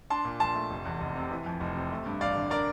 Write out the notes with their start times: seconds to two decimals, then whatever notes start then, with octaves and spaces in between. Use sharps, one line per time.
0.10 D4 A5 C6
0.25 A#2
0.40 A#1 A5 C6
0.55 A3
0.70 F1
0.85 E2
1.01 F1
1.16 C3
1.31 E3
1.46 F2
1.60 F1
1.75 C3
1.91 A3
2.06 G2
2.21 A1 D5 F5
2.36 D3
2.50 D4 A#4 D5